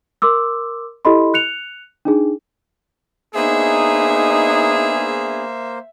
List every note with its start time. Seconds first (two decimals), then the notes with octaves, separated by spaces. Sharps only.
0.22 A#4 C6 D6 E6
1.05 E4 G4 A4 D#5 B5 C6
1.34 F#6 C#7 F7
2.05 D4 D#4 G#4
3.35 A#3 B3 D4 D#4 G#4 C5 E5